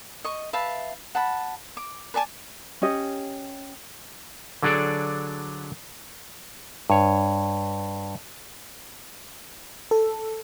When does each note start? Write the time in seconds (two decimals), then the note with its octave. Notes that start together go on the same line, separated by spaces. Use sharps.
0.24 D#5 C#6
0.53 B4 E5 F5 A5
1.15 F#5 A5 B5
1.77 D6
2.14 B4 D5 G#5 A5
2.82 C#4 G4 D#5
4.63 D3 F#3 D4 G#4 A4 D5
6.90 G2 C#5
9.91 A4